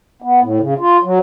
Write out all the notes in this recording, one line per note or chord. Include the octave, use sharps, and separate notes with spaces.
B3
A2
C#3
F4
F#3